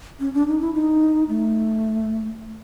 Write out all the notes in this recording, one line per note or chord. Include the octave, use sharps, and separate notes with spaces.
C#4
D4
D#4
E4
D#4
A3